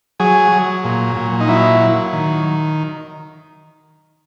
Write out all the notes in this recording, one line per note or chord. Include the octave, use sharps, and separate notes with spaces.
F#3 G#4
F#3
A#2
A#2
D#4
F#3 E4
F#3
D#3